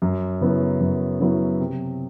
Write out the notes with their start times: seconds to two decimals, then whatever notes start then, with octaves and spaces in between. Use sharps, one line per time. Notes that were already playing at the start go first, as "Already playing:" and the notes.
0.02 F#2
0.41 C#3 F#3 B3 E4
0.80 F#2
1.20 C#3 F#3 B3 E4
1.59 C3